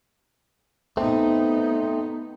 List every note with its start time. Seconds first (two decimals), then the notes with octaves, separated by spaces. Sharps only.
0.97 A3 B3 C4 D#4